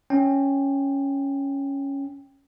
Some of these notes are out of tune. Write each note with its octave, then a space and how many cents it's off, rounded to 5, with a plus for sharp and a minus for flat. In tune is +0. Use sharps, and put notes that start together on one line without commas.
C#4 +0 G5 +10